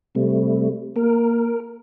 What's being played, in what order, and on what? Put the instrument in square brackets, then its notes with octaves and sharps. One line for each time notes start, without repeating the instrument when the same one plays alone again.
[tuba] C3 [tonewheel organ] G3 A3
[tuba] A#3 [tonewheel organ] A#4